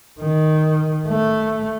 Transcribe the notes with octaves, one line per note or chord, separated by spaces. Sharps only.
D#3
A3